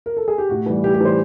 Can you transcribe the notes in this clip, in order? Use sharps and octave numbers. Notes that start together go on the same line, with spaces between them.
A#4
A4
G#4
G4
A2 F#4
E3 G3
A2 G4
G4
E3 G3 C5